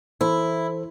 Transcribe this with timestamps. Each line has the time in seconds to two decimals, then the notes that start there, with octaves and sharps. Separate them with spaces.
0.21 E3 E4 A4 C5